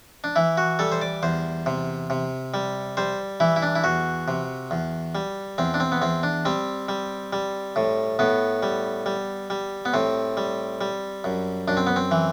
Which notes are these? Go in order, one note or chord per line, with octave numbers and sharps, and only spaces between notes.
D4
E3 E4
F#4
G3 A4
C5
D5
E2 C5
C3
C3
G3
G3 C5
E3 E4
E4
D4
E4
E2 F#4
C3
E2
G3
E2 C4
D4
C4
B3
E2 C4
D4
G3 C4
G3
G3
A2
A2 B3
G3
G3
G3
B3
A2 C4
G3
G3
F#2
F#2 D4
C4
B3
C4
E3